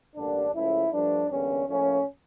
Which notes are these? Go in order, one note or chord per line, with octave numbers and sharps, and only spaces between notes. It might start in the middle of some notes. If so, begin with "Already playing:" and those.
A1 G2 D3 G3 A#3 D4
C#2 C#3 F3 A3 E4
G2 F3 A3 D4
E2 D3 G3 A#3 C#4
A2 F3 A#3 C#4